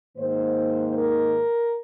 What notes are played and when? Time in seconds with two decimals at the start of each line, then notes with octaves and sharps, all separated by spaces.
0.17 G#2 D#3 A#3 D#4 C5
0.96 A#4